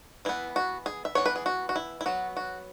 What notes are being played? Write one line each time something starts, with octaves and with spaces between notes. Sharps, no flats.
E3 B3 E4
F#4
G#4
E5
E3 B3 C#5
B4
G#4
F#4
F#4
E4
E4
F#3 B3 F#4
F#4